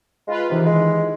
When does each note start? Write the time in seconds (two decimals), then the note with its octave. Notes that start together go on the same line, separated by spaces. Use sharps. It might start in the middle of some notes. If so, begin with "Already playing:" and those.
0.28 G#3 F4 B4
0.50 C3 D#3 E3
0.65 G#3